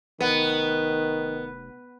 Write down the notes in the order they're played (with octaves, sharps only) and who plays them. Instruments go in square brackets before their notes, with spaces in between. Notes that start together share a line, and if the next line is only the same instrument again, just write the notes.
[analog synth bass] F1 [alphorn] D#3 [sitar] B3